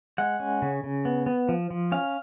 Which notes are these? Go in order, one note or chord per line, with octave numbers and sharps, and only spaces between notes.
G#3 F#5
C#4
C#3
C#3
B3
B3
F3
F3
C#4 F5